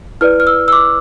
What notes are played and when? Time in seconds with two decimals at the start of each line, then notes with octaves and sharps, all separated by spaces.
0.21 E4 B4 D5 F6
0.40 F6
0.47 E6
0.68 E6
0.72 D6